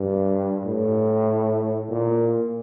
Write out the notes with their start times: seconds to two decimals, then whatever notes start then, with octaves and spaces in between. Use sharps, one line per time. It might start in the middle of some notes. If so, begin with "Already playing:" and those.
Already playing: G2
0.66 A2
1.90 A#2